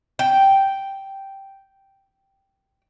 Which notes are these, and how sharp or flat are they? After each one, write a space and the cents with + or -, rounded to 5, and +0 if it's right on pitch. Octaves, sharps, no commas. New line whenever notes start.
G5 -5